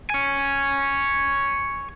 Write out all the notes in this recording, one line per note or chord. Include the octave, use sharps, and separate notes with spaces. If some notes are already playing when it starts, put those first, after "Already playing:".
C#5 G#5